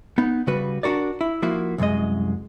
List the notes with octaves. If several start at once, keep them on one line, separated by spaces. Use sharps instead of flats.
B3 D#4
C#3 G3 F#4 B4
D4 D#4 F#4 A#4 D5
E4
F3 A#3 E4 F#4
C2 F#2 F3 G#3 D#5